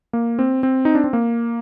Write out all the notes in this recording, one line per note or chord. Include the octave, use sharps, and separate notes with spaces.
A#3
C4
C4
D#4
D4
C4
A#3